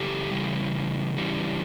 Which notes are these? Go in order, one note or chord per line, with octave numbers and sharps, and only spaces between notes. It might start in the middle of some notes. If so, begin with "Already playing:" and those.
Already playing: C#3 E3 G4 A4
C#3 E3 G3
C#3 E3 G3